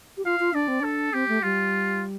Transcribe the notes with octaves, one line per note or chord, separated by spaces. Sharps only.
G4
F4 F5
F4
D4 D5
C4
D4 A4
C4 G4
A3
G3 F4